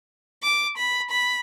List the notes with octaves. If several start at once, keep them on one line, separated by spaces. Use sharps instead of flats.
D6
B5
B5